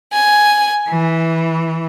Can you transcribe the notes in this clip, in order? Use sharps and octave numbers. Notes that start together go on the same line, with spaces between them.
G#5
E3